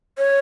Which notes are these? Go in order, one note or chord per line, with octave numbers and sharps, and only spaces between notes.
C#5